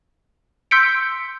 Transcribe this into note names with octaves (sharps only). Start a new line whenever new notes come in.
C6 E6 G6 B6 C#7 D7